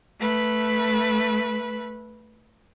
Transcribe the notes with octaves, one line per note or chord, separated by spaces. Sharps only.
A3 B4